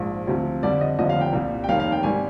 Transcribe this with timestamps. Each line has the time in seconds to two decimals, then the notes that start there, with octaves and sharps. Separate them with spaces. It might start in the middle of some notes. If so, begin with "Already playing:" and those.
Already playing: A#1 G#2 F3
0.27 D2 C3 F3
0.63 F2 D3 G3 D5
0.81 D#5
0.98 F1 D#2 D3 F3 D#5
1.09 F5
1.21 G5
1.33 C2 A#2 G3
1.64 G5
1.69 F1 D#2 D#3 G3 F5
1.80 F5
1.92 G5
2.03 G#1 G3 G#5